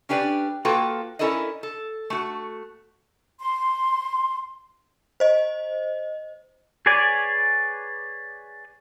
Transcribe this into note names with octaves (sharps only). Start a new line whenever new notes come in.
C#4 D4 G4 B4 C5 D5
A#3 F4 F#4 A4 B4 G5
C#4 E4 A4 A#4 D5 D#5
A4
A3 F#4
C6
C5 D#5
G#4 B4 C#5 D5 G#5